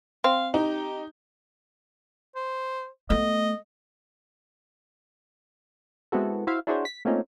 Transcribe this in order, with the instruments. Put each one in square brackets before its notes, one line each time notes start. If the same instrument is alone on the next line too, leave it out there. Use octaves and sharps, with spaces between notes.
[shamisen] C4 [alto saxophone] F5
[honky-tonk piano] D#4 [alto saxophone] G4
[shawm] C5
[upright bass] A3 B3 [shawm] D#5
[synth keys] G#3 B3 C4 E4 F#4 A4
E4 F#4 C5 E5 F5
D4 E4 F#4 G#4 C5 C#5
B6
A3 A#3 C4 C#4 D#4 F4